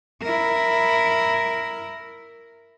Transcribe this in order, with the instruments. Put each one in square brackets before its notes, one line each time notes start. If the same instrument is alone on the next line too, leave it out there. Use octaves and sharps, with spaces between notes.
[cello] E4 A#4